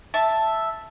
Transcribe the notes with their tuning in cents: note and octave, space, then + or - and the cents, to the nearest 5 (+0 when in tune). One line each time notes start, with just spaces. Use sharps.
E5 +0 A5 +0